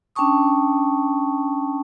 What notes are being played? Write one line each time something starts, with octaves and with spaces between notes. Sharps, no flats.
C#4 D4 G5 A5 C#6 D#6